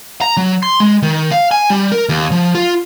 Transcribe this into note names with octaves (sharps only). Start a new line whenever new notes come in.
A#5
F#3
C6
G#3
D#3
F5
G#5
G3
A#4
D#2
F3
F4